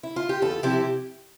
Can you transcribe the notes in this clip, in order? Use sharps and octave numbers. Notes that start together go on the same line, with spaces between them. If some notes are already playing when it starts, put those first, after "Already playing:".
E4
F4
G4
E2 F4 A4
C3 F3 C4 E4 G4